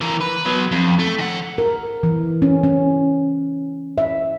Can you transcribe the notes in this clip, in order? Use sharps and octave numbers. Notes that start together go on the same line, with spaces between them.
E3 A#4
B4
B2 F#3
F2
A3
D#3 F#5
A#4
E3
C#4
C#4
E5